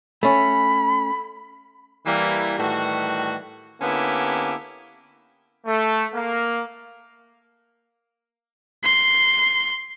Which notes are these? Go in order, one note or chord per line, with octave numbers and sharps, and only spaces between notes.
A3 C#4 B5
E3 G3 A#3
A2 D#3 E3 G3 F#4
D3 A#3 B3 C#4 E4 G4
A3
A#3
C6